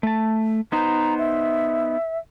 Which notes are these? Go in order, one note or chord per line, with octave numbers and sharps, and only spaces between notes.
A3 A5
B3 D#4 C5 A#5
E5